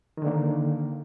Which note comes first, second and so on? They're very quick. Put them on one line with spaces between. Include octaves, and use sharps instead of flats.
D#3 D3 A#3